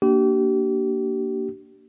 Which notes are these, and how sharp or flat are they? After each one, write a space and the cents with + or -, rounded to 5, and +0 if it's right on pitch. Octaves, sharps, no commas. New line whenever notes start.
A#3 +0 D4 +0 G4 -35